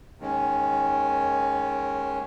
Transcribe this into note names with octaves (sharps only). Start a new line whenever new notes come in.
D#2 D#3 G#3 C#4